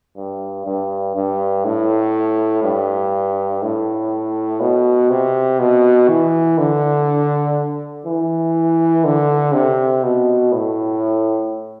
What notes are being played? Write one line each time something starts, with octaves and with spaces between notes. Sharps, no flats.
G2
G2
G2
A2
G2
A2
B2
C3
B2
E3
D3
E3
D3
C3
B2
A2